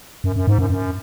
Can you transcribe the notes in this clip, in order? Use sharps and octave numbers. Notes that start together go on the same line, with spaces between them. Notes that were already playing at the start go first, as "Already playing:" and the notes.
F#2
F#2
G#2
F#2
F#2